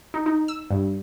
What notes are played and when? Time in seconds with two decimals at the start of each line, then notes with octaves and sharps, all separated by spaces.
0.14 D#4
0.26 D#4
0.48 E6
0.71 G2